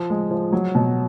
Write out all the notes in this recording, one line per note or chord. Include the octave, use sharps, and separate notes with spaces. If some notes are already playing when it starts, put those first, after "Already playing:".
Already playing: F3
G#3
F3
F#3
B2